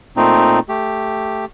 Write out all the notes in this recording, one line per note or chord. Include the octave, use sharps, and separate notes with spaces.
A#2 A3 C4 D#4
A3 G4